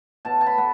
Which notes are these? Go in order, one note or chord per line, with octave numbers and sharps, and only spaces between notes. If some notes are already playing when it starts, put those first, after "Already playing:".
B2 A5
A5
B5
B3